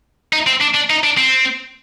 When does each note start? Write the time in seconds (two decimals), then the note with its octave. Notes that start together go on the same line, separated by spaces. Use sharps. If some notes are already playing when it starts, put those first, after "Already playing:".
0.33 D#4
0.47 C4
0.61 D4
0.75 D4
0.90 D#4
1.04 D4
1.18 C4